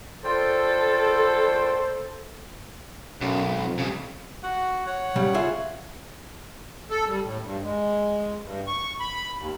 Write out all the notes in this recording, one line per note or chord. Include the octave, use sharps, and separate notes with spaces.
F4 A4 C5 D5 G5
B1 F#2
G#1
F2
C#3 G3
F#4 F#5
C#5 F#5
C#3 G3
F4 G#4 E5
A4
G3
A2
G2
G#3
G2
C#6
B5
D#2